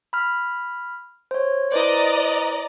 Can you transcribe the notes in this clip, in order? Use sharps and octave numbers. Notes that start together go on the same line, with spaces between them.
B5 F6
C5 C#5
E4 B4 C5 D5 D#5 A#5